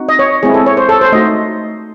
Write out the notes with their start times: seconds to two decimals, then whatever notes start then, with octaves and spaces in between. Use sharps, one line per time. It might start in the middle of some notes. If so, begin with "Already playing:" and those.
Already playing: C4 D#4 F#4
0.09 D#5
0.19 C#5
0.43 G#3 C4 E4 G#4
0.54 A4
0.66 C#5
0.77 C5
0.89 A4
1.01 C5
1.12 A3 D#4 F#4 D#5